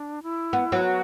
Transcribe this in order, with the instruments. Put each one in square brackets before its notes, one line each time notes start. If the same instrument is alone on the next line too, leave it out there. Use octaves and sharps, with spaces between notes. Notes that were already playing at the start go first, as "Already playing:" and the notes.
Already playing: [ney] D4
E4
[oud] B3
F#3 B3
[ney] F#4